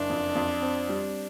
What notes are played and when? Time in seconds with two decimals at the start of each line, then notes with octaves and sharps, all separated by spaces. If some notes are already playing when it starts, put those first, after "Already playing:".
Already playing: F#1 D4
0.10 F2
0.35 F2
0.62 C4
0.89 G3